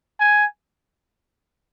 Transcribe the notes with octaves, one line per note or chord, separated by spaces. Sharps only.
G#5